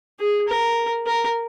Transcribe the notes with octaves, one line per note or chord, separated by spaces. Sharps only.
G#4
A#4
A#4